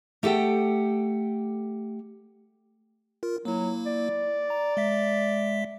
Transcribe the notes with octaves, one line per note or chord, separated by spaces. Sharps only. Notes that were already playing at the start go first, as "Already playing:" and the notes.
A3 G4 A4 F#5 G5
F4 A#4
F#3 A#3 E4
D5
A#5
G#3 E5 B6